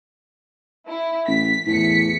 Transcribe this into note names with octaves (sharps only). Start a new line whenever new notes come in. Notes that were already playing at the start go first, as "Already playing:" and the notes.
E4
A1 B6
E2 A2 B6 C#7